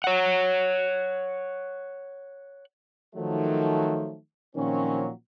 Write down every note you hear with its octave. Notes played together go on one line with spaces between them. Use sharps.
C#5 F#5
D#3 F3 F#3 A3
A#2 D#3 F3 F#3 C4 C#4